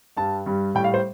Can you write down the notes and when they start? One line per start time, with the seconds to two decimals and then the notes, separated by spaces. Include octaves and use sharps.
0.17 G2 G3 A5
0.46 G2 G3
0.75 A2 G3 G5
0.84 F5
0.94 C5